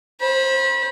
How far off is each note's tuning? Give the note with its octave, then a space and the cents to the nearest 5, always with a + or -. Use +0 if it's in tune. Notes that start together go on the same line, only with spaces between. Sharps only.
C5 +20 B5 -30